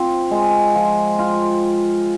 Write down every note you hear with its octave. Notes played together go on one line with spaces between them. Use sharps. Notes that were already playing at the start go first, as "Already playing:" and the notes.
Already playing: C4 F4
G#3
F3
F4